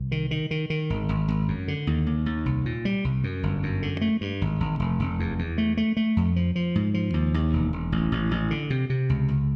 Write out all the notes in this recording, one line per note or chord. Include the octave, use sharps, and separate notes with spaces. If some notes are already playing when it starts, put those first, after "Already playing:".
Already playing: C2
D#3
D#3
D#3
D#3
G#1
G#1
G#1
F#2
D3
D#2
D#2
D#2
C2
A#2
G3
C2
F#2
G1
F#2
D3
A3
G2
G#1
G#1
F1
F1
E2
E2
A3
A3
A3
F2
F3
F3
G#2
F3
D#2
D#2
E1
E1
A1
A1
A1
D3
C3
C3
C#2
C#2